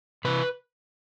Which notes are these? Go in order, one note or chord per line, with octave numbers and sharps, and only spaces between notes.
C3 E3 B4